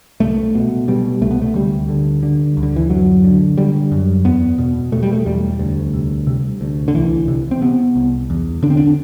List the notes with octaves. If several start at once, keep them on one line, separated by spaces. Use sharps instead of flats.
C2 A3
B2
B2 G3
C2 A3
B3
A3
D2 G3
D3
D3
D2
D3
E3
F#2 F#3
D3
D3 G3
F#2
E2 B3
B2
B2 A3
G3
A3
E2 G3
D2
C3
C3
D2
D3
C2 E3
C3
C4
C3 B3
C2
E2
D3 D4
C4
D4